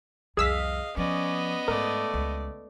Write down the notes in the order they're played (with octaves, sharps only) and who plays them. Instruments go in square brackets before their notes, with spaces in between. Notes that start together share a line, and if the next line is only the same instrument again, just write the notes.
[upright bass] C2 F2 [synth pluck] G#4 E6 B6 [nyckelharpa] D#5 F5
[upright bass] F3 [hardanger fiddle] B3 D#5 [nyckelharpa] C#4 D5
[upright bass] G#2 [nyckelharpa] A3 D5 [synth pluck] A#4
[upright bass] C#2